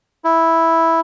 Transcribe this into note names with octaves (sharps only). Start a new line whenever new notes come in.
E4